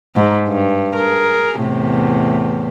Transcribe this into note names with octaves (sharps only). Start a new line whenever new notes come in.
G#2
G2
G#4 A#4
E2 A2 C3